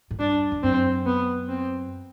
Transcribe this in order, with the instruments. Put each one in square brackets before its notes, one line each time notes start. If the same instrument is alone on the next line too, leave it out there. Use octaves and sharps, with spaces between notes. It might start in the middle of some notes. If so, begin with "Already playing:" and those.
[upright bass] A2
[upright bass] G2 [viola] D4
[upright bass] E2
[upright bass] F#2 [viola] C4
[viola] B3
C4